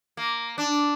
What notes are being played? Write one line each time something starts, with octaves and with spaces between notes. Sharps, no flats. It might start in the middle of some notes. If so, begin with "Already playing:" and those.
A#3
D4